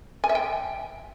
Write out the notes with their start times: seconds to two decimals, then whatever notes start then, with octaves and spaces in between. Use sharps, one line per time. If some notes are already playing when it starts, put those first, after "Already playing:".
0.24 G#5
0.29 E5
0.35 G5